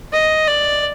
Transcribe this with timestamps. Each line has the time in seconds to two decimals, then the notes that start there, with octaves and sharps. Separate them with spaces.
0.13 D#5
0.48 D5